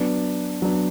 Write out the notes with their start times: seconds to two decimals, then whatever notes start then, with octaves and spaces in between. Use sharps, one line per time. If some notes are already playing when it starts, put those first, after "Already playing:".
Already playing: F#3 B3 D4
0.62 F#3 B3 D4